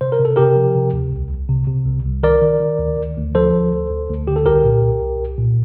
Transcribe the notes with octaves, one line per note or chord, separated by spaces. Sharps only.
C3 C5
A#4
C3
A4
C3 G4 A#4
F3
C3
D2
C2
C2
C3
C3
C2
C2
D#3 A#4 D5
D#3
D#3
D2
D2
D2
F3 A4 C5
D2
D2
D2
D2
D3 G4
A4
C2 G4 A#4
A#2
C2
C2
C2
A#2